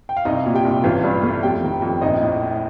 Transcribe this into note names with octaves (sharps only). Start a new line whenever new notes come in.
G5
F5
C2 D#4 D#5
A#2
G4 G5
C2
A1 F4 F5
G2
A3
F2 G4 G5
D#3
F2
A#1 D#4 D#5
A2